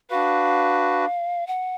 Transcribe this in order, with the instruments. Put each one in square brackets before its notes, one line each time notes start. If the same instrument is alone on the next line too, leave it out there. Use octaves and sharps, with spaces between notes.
[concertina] D4 F#4 B4 [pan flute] F5
[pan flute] F#5